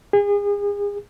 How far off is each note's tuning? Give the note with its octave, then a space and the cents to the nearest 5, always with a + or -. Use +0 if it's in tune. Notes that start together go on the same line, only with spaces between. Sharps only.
G#4 -35